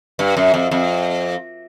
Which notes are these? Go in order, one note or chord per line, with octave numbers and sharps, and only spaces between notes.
G2
F#2
F2
F2